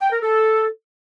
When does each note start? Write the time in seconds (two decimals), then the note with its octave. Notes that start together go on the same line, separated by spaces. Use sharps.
0.01 G5
0.12 A#4
0.22 A4